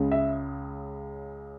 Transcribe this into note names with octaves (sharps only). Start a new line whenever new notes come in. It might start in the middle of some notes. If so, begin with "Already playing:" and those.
Already playing: C#2 C#3 G#3
E5